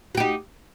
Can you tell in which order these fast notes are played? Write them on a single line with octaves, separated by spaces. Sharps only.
F#4 G4 D#4